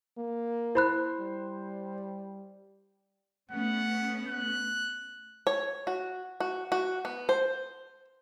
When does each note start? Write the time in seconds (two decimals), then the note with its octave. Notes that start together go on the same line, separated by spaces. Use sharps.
0.17 A#3
0.75 E4 C5 B5 F#6
1.19 G3
3.51 A3 B3 C#4 F#5
4.28 F#6
5.47 C#5
5.87 F#4
6.40 F#4
6.72 F#4
7.05 B3
7.29 C5